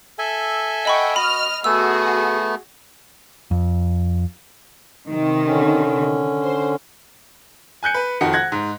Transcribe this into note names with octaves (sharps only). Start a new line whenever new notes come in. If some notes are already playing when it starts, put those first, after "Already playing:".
A4 E5 G#5
D#5 F#5 G5 B5 C#6
F#4 D#5 B5 F6
A3 B3 F#4 G#4 E6
F2
C3 D#3
D3 C#4
C5
G#5 F#6 G6 C#7
B4
F2 D#3 F#4 C#7
F#5 F#6 G#6 A#6
G#2